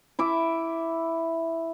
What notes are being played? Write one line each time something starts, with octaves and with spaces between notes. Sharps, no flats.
E4 E5 D6